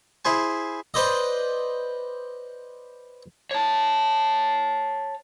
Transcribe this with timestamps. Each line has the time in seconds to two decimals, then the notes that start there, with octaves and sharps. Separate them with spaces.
0.25 E4 G#4 C5 G#5
0.94 B4 C5 D5 D#5
3.51 C#5 A5